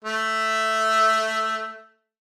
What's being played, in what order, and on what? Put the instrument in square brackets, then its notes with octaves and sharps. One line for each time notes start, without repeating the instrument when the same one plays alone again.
[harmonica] A3 E5